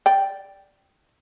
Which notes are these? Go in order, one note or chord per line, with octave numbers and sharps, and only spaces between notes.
D5 G5